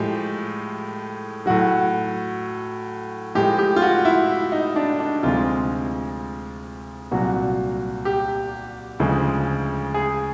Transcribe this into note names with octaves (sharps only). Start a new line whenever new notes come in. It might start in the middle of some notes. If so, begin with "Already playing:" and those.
Already playing: A2 F3 G#3 G4
A2 F#3 F#4
A2 F3 G#3 G4
G4
F4
F#4
E4
D#4
D4
D4
D2 C3 F3 G#3 F4
C2 A#2 F#3 F#4
G4
D2 C#3 F3 G#3
G#4